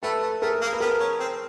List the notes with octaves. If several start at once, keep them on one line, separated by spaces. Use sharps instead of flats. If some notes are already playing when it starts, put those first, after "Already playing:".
A3 A4 B4
A3
A3 G#4 A#4
A#3
B4
B3 G#4 A#4
C#4
C4